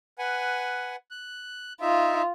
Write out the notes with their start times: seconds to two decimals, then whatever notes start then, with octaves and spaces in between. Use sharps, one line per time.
0.18 B4 F#5 G#5
1.11 F#6
1.81 D#4 F4 E5